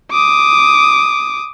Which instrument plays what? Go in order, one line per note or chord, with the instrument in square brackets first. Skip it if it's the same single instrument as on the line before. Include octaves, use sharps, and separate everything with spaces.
[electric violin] D6 D#6